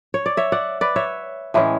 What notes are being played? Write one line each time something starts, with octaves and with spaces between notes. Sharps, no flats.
C#5
D5
C#5 E5
D5 F#5
B4 D5
C#5 E5
A2 E3 G#3 C#4